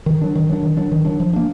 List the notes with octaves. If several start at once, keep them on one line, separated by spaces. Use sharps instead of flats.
D#3
F#3 D4
D#3
F#3 D4
D#3
F#3 D4
D#3
F#3 D4
F3
A#3 D4